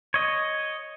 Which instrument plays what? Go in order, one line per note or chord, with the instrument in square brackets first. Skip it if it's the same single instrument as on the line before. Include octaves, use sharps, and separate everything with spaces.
[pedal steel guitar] C#5 D#5